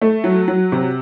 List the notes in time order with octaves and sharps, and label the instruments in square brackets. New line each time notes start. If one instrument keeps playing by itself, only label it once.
[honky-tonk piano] A3
F#3
F#3
C3